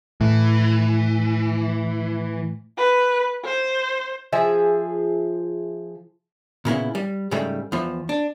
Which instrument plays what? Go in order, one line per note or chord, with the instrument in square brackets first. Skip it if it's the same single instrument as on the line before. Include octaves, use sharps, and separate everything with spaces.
[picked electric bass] A2 [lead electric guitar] E3
[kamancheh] B4
C5
[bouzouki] F3 G#4 E5
[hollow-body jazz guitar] A#2 C#3 B3 E4
G3
G#2 C#3 G3 A3
E2 F3
D4